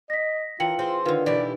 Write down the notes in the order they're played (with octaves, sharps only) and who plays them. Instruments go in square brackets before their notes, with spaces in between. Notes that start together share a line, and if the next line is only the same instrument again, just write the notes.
[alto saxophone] D#5 [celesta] A#6 B6
[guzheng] E3 [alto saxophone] F4 [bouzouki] A#4 [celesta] G5 C#7 F#7
[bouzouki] C4 G#4 C5
[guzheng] D3 D#3 [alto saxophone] F4 [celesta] B4
[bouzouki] B2 E4 G4 [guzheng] E3 [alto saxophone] D5